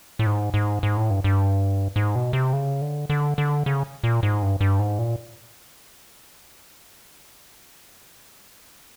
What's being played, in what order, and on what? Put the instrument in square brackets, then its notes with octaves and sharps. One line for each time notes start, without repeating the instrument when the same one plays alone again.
[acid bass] A2
G#2
G#2
G#2
A2
G2
G2
G#2
B2
C3
C#3
D3
D3
D3
C#3
A#2
G#2
G2
G2
G#2
A#2